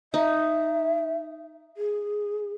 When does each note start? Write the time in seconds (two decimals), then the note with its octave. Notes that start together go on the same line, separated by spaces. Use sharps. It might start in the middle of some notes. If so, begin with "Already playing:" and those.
0.14 D#4 E5
1.77 G#4